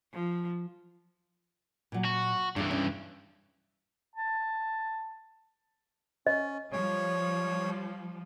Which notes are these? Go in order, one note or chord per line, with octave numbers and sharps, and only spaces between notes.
F3
A#2 F#3
F#4
G2 E3 D4 A4 A#4
C#4
A5
C#4 D#5
F3 G3 C#5